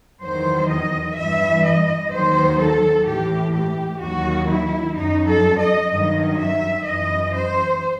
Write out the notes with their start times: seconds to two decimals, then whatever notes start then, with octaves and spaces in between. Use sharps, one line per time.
0.22 E2 D#3 F#3 C5
0.69 D#5
1.17 G2 E3 E5
1.64 D#5
2.11 D#2 D#3 F#3 C5
2.59 A4
3.07 A2 E3 G4
3.54 G4
4.01 D#2 D#3 F#3 F#4
4.49 E4
4.96 F#2 F#3 D#4
5.28 A4
5.60 D#5
5.91 G2 D#3 F#3 D#5
6.39 E5
6.86 F#2 E3 D#5
7.34 C5